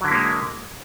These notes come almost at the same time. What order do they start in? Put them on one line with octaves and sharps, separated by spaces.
F#3 D3 E4 A#3 G#3